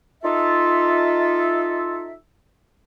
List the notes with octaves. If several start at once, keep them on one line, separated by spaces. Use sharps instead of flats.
D#4 F4 A4 E5